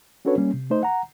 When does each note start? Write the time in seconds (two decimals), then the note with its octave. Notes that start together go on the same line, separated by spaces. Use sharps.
0.25 C#4 D4 F#4 A4 B4 C#5
0.38 G3 A#3 C#4
0.53 C3
0.70 A3 D#4 C5 D#5
0.83 F#5 A#5